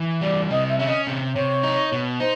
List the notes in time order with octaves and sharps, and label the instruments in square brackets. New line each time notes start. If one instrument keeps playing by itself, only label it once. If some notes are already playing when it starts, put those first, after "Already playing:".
Already playing: [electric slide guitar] E3
[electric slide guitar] G3 [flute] D5
[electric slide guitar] C3 [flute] D#5
[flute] E5
[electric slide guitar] C#4 [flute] E5
[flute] D#5
[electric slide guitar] C3
[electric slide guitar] C3 [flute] C#5
[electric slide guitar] D#4
B2
[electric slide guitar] D#4 [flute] C5